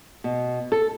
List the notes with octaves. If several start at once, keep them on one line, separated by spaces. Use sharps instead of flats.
B2
A4